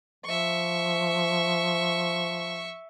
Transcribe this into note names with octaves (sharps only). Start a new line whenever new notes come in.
F3 E5 C#6